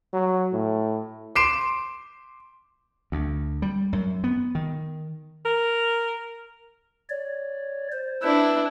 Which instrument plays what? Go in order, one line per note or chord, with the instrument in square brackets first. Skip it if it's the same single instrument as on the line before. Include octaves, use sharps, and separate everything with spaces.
[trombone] F#3
A2
[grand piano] C6 D6 C7 D7 E7
[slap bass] D2
G3
F#2
B3
D#3
[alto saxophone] A#4
[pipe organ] C#5 D5
C5
[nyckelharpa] D4 E4 [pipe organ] B4 A5